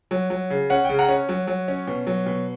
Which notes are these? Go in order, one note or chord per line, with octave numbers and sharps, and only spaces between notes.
F#3
F#3
C#3
C#4 F#5
C#3 G5
F#5 A#5
C#4
F#3
F#3
C#4
B2
F#3
B2